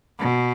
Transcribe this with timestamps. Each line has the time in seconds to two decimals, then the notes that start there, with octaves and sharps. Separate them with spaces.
0.19 B2